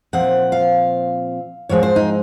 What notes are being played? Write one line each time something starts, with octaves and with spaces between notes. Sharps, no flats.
A#2 F3 C4 F#5
F5
G#2 F3 G#3 C4 C#5
C5
D#4